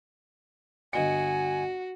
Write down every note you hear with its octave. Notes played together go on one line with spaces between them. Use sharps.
G1 F#4 D#5 G#5 C#7